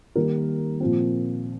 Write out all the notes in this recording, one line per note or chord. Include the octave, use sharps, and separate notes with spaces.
D#3 G3 A#3 A#4
A#2 F3 C4